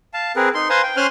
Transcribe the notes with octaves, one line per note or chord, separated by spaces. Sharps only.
F5 A5
C4 G#4 A#4 B4
D#4 C6
B4 C5 F5 G#5 A#5 C6
G5
C#4 C5 G#5 C6 F6 F#6